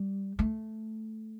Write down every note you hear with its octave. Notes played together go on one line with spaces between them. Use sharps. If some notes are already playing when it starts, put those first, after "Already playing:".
Already playing: G3
A3